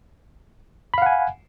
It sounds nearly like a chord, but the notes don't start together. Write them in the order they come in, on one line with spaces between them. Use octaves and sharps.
B5 F5 F#5 G#5